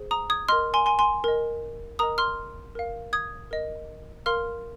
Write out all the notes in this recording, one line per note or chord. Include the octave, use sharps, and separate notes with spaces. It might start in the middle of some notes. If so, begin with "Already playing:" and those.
Already playing: G#4 C5
A#5 D#6
D#6 G#6
A#4 D#5 C6 F6
G#5 C6
G#5 C6
G#5 C6
A#4 D#5
A#4 D#5 A#5 D#6
C6 F6
A#4 F5
D#6 G#6
A#4 D#5
A#4 F5 C6 F6